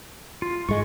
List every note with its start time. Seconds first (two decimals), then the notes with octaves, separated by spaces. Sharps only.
0.42 F4
0.69 G#2 G#3 C#6